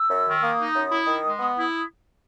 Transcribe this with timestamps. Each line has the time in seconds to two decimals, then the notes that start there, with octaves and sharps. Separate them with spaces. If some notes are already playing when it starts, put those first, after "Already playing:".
Already playing: E6
0.10 F#2
0.26 D#3
0.42 A#3 D#6
0.59 D#4
0.75 F#2
0.91 E4
1.07 D#3
1.24 G#3
1.39 B3
1.56 E4